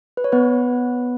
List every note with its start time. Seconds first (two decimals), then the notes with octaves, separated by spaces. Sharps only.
0.17 B4
0.24 C#5
0.32 B3 B4